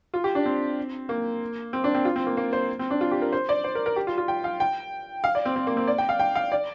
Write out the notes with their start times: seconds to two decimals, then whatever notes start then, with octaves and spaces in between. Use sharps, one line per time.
0.14 F4
0.24 G4
0.35 D4
0.46 C4
1.09 A#3
1.73 C4
1.84 D4
1.95 C4
2.05 F4
2.16 C4
2.26 A#3
2.37 A#3
2.53 C5
2.79 C4
2.90 D4
3.01 F4
3.11 G4
3.22 A#4
3.33 C5
3.49 D5
3.64 C5
3.75 A#4
3.86 A#4
3.96 G4
4.07 F4
4.18 F4
4.28 G5
4.44 F5
4.60 G5
5.24 F5
5.35 D5
5.45 C4
5.56 C4
5.67 A#3
5.77 C4
5.87 D5
5.98 G5
6.09 F5
6.19 G5
6.35 F5
6.52 D5